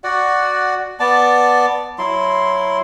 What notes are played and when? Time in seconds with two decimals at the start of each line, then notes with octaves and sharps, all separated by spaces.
0.04 F#4 D5 F#5
1.00 B3 D5 A5
1.98 F#3 E4 C6